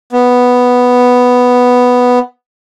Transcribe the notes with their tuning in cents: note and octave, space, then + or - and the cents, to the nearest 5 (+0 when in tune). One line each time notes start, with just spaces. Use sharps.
B3 +0